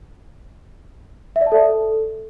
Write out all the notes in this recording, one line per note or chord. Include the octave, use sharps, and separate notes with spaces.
E5
D5
A5
A4